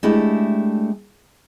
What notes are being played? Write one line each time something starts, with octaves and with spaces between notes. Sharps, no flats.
G#3 A3 D4 E4 G4